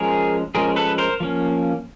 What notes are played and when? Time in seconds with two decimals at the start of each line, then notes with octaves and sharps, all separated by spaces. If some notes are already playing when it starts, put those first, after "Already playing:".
Already playing: F3 G#3 C#4 G#4 A#4
0.55 F3 G#3 C#4 G#4 A#4
0.76 A4 B4
0.98 A#4 C5
1.20 F3 A#3 C#4